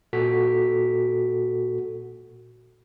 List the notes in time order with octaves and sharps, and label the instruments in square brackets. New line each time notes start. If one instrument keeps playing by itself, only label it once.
[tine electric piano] A#2 F#4 A4 B6